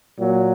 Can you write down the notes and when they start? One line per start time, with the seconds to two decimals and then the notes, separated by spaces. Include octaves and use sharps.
0.18 A#2 F#3